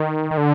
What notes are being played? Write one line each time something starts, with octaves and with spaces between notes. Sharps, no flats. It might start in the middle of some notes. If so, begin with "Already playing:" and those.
Already playing: D#3
D#3
D3